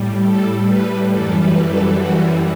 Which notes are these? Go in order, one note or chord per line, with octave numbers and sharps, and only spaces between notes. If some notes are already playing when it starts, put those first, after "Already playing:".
Already playing: A2 G3
A4
B4
F#2 E3 G3 A4
B4
A4
F#4